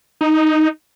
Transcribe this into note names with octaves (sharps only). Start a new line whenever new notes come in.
D#4